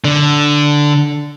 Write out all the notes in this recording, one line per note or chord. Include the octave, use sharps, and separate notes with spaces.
D3